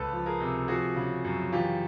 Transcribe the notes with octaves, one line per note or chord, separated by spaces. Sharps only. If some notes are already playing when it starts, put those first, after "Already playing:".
Already playing: C#2 A4 B4
F3
G#4 A#4
C3
F3 F#4 G#4
C#3
F#2
E3 F4 G4